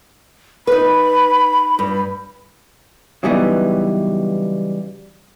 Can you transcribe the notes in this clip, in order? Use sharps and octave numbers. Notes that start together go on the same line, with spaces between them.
D#4 B4 B5
G2
C#3 E3 F#3 G3 B3 D#4